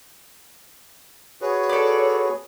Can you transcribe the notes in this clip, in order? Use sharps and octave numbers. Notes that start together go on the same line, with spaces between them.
F#4 G#4 B4 C#5
A4 D5